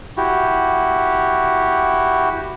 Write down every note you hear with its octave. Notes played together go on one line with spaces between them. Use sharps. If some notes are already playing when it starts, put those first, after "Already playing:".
E4 F#4 G4